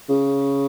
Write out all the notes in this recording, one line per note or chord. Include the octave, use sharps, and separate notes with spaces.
C#3